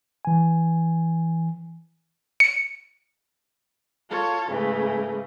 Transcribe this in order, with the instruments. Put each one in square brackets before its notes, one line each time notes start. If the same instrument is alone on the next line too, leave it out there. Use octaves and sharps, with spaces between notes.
[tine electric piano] E3 G#5
[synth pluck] C#7
[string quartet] F4 A4 C#5
G#2 C#3 E3 A3